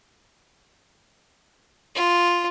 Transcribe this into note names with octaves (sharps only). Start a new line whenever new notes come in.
F4